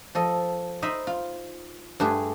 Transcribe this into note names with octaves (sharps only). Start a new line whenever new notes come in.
F3 A4 D#5
D#4 C5 D#5 E5 B5
F4
G2 A3 G4 G#4